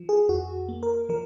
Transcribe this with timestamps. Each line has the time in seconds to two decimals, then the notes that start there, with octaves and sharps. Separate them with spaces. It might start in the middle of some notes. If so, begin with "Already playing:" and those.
Already playing: F3
0.09 G#4
0.29 F2 F#4
0.69 A#3
0.83 A#4
1.09 F3 A#4